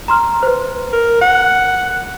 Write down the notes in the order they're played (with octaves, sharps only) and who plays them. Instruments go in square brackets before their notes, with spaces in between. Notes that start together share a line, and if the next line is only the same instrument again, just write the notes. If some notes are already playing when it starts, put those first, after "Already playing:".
[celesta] A#5 C6 F6
B4 C5
[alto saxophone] A#4
F#5